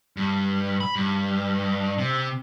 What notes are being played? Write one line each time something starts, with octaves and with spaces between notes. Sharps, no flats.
G2
B5
G2
C3